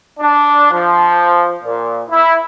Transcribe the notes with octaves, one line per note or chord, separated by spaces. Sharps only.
D4
F3
A#2
E4